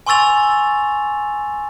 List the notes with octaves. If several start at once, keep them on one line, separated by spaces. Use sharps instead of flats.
G#5 C6 C#6 E6 A6 F7